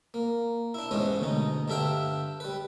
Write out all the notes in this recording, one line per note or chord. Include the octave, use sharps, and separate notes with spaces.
A#3
D4 E4
G#2 E3 G#3 B3 C#4
D2 B2 D#4
G2 D3 D4 E5 F5 G5
G3 B4